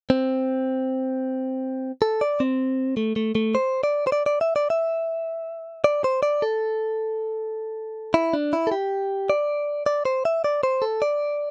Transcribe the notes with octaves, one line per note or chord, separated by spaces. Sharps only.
C4
A4
D5
C4
A3
A3
A3
C5
D5
C5
D5
D5
E5
D5
E5
D5
C5
D5
A4
E4
D4
E4
A4
G4
D5
D5
C5
E5
D5
C5
A4
D5